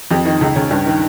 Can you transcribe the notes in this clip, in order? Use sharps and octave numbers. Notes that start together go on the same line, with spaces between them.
F2 G4
D#3 D#4
C#2 D#4
C#2 C#4
G2
D#3